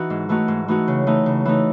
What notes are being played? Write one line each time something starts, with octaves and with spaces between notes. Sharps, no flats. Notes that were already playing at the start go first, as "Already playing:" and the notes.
Already playing: E3 D#4 F#4
G#2
E3 A3 D#4 F#4
G#2
E3 A3 D#4 F#4
C#3
E3 A3 D#4
C#3
E3 A3 D#4